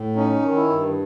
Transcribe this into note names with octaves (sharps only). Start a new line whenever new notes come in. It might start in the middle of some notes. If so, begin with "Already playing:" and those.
Already playing: A2
C#4 D#4
D#3
E4
G2